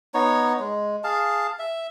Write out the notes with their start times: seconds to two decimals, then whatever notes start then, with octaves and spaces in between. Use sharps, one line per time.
0.14 B3 D#4 C#5
0.60 G#3
1.04 G#4 F5 A5
1.59 E5